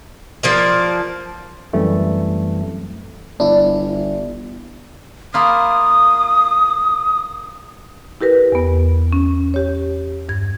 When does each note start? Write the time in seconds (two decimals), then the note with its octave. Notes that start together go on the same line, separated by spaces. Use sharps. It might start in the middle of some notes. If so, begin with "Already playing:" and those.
0.43 F3 A#3 D5
1.73 F#2 E3 G3 A3 C4
3.40 G1 D4 E4
5.34 A#3 E4 F4 D#6
8.21 E4 G4 A#4 B4
8.52 E2 B3
9.13 C#4
9.54 G4 C#5
10.29 G2 G#6